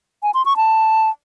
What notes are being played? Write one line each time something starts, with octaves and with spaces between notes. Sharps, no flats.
G#5
C6
C#6
A5